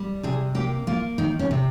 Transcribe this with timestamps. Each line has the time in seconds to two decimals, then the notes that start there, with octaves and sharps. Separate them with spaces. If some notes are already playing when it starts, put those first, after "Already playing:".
Already playing: G3
0.23 C3 G#4
0.55 A#3 G4
0.87 A#3 F4
1.18 D#3 D#4
1.39 C#4
1.51 C3